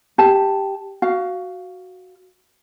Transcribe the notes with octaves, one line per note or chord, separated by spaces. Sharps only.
G4 A5
F#4 F5